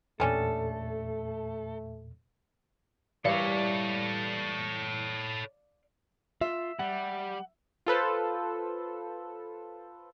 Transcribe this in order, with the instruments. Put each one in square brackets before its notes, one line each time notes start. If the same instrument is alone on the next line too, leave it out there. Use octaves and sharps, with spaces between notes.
[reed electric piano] E2 A#2 [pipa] G3 C#4 D4 [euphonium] A3 [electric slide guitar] A4
[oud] E3 G3 [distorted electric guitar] A4 C#5 [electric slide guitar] D5 F5
[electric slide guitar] F4 [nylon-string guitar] E5
[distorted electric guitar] G3 [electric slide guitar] F#5
[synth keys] F4 A4 B4 C5